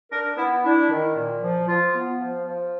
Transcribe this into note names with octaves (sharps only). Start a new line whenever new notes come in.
D4 A#4
B3 E4
D4 E4
D#3
A#2
F3
F3 F4
B3
F3
F3